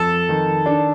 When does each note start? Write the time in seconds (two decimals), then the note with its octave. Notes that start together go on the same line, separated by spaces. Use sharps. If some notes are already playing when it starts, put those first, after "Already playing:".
Already playing: F2 A4
0.29 D#3
0.66 D4